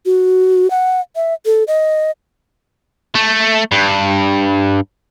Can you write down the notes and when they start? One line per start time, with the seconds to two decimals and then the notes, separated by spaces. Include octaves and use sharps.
0.06 F#4
0.71 F#5
1.16 E5
1.46 A4
1.68 D#5
3.15 A3
3.72 G2